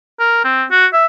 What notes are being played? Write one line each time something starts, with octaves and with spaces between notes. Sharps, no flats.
A#4
C4
F#4
E5